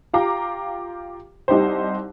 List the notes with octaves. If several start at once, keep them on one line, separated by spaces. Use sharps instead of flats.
F4 G4 F5 G5 A#5 D6
C2 D#4 G4 C5